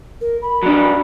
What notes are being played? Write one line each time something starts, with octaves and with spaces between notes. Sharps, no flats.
A#4
B5
F#3 D4